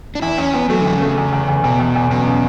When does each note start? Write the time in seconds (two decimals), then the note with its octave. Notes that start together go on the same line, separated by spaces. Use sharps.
0.15 D4
0.22 E2 E4
0.38 E2 C#4
0.54 E2 B3
0.70 F#3 A3
0.81 E2 D3
0.93 C#3
1.01 A3
1.17 E2
1.33 E2
1.48 E2
1.64 E2 B2
1.80 E2
1.96 E2
2.11 F#2 B2
2.27 C#3